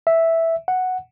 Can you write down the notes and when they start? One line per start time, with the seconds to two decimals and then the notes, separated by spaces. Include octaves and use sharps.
0.07 E5
0.68 F#5